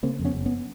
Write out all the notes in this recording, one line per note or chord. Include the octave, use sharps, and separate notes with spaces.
C#3 A#3 C4
F2
B3 C#4
F#1
B3 C#4